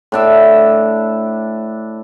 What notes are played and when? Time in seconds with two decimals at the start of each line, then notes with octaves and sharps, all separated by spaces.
0.12 A2 D4 E5